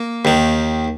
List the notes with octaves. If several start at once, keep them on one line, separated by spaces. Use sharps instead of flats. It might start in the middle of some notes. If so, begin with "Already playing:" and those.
Already playing: A#3
D#2 D#3